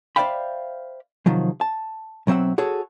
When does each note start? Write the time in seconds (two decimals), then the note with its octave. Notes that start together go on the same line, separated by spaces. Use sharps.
0.16 C5 D5 E5 F5 G5 B5
1.26 C3 D#3 F3 F#3
1.61 A5
2.27 B1 F#3 C4 E5 F#5
2.58 F#4 G#4 A4 C#5